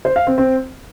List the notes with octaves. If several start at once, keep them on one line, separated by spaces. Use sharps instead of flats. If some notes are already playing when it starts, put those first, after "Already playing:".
C5
F5
C4
C4